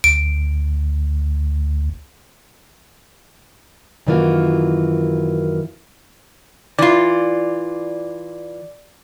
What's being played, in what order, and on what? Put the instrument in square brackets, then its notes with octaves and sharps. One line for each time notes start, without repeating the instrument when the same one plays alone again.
[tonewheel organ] D2 [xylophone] D7
[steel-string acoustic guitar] F#2 D#3 E3 A#3 F4 F#4
[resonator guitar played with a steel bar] E3 F4 [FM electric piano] D5